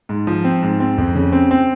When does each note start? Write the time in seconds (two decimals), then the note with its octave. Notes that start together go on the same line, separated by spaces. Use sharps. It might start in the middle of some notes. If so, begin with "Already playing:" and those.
0.09 G#2
0.27 F3
0.44 C4
0.63 G#2
0.80 C4
0.98 F2
1.16 C#3
1.32 C4
1.51 C4